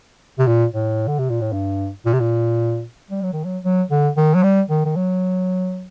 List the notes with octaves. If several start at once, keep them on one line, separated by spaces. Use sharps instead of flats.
C3
A#2
A2
D3
C3
A#2
A2
G2
A#2
C3
A#2
G3
F#3
D#3
F#3
F#3
D3
D#3
F#3
G3
D#3
D#3
F#3